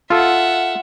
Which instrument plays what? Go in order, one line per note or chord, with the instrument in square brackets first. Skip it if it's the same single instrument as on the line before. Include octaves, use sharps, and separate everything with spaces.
[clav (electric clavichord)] F4 A4 [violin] E5 F#5